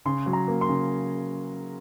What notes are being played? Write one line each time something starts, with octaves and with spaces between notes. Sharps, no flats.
C#3 C6
F#3
A#5
A#3
C6
C#3